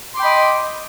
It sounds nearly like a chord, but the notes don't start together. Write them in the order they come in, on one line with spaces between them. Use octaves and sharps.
C6 D6 G5 B5 D#5